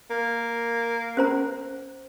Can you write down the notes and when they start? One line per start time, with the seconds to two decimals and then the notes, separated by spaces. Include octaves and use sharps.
0.10 A#3
1.17 C#4 C5 A#5